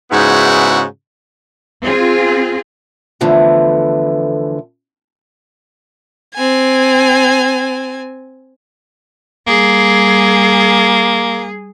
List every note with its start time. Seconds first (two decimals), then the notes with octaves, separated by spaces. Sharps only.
0.11 G#2 C#3 B3 D#4 E4 F#4
1.83 C4 F4 G#4
3.21 E2 D3 E3 F3 A3
6.35 C4 G#5
9.47 G3 A#3 G#4